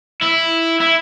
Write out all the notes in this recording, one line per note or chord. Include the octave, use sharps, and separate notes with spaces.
E4
E4